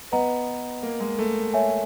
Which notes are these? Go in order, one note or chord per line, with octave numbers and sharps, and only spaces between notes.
B3 B4 D#5 F#5 A#5
A#3
G#3
A3
C#5 E5 G#5